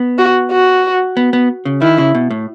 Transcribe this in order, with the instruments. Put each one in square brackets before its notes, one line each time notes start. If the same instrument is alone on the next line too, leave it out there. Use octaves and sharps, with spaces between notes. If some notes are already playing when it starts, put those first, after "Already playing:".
Already playing: [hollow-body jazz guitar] B3
[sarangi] F#4
F#4
[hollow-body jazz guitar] B3
B3
C#3
[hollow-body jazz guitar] D#3 [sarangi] E4
[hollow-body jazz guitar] C#3
B2
A2